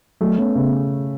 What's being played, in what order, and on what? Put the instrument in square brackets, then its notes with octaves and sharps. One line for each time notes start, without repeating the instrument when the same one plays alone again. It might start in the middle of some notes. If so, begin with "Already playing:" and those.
[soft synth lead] F#3 [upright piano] A3
[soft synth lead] B3 [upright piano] C#4
[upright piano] C#3 [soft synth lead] B3